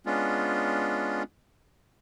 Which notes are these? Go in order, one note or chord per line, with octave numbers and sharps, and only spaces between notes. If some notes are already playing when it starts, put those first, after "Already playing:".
G#3 B3 C#4 D4 F4